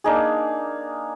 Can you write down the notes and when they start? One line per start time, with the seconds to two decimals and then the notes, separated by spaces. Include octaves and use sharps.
0.04 A#3 D4 D#4 G#4